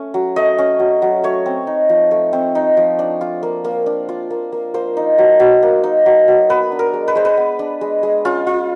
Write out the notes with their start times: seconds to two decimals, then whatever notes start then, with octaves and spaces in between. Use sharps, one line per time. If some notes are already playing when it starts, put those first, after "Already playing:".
Already playing: A3 C#4
0.14 F#3
0.36 A3 D#5
0.58 C#4
0.79 F#3
1.02 F#3
1.23 A3 C#5
1.46 C4
1.67 D#4
1.89 F3
2.11 A3
2.33 C4
2.55 D#4
2.77 F3
2.99 D4
3.21 F4
3.43 A#3
3.64 A#3
3.86 D4
4.09 F4
4.30 A#3
4.52 A#3
4.74 A#3 C5
4.97 D#4
5.18 F#3
5.40 F#3
5.63 A#3
5.84 D#4
6.06 F#3
6.28 F#3
6.49 B3 B4
6.72 D4
6.79 A#4
6.94 G#3
7.08 B4
7.15 G#3 C5
7.25 B4
7.37 B3
7.59 D4
7.81 G#3
8.03 G#3
8.25 C#4 F4
8.47 F4